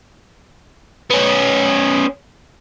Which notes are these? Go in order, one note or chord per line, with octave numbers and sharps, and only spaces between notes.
B3 C#4